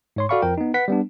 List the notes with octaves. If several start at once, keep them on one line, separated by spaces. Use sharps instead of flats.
G#2 C#5 C6
F#4 A4 D5 F5 B5 C#6
F2 F3 A#4 G5
B3 D#4
B4 F#5 B6
G3 B3 D4